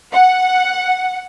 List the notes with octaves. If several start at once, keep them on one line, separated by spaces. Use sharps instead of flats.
F#5